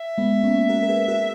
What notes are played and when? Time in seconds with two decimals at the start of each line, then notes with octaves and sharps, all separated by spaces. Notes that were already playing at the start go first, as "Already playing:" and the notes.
Already playing: E5
0.18 G#3 B3
0.43 A#3 C#4
0.69 F#4 A#4
0.82 A#4
0.89 G#4 B4
1.08 F#4 A#4